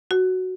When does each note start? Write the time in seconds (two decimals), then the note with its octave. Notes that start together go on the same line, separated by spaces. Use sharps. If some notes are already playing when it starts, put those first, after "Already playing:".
0.11 F#4